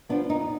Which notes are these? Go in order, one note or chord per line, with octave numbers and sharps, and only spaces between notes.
F3 B3 D4
F2 D#4